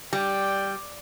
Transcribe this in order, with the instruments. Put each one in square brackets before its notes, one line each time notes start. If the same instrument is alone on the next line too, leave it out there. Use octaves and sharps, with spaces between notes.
[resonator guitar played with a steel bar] G3 [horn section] D5 G5